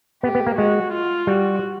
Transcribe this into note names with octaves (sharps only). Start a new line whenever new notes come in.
B3 G4
B3
A#3
G#3 F#4
F4
G3 F#4